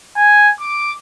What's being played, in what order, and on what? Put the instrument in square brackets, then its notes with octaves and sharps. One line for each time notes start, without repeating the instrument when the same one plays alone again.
[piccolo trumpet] G#5
D6